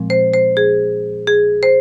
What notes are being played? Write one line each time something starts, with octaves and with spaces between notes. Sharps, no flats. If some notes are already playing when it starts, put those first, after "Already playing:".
Already playing: A#2 F3 G#3 C4
C5
C5
G#4
G#4
C5